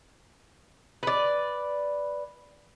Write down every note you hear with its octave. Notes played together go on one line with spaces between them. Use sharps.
B4 D5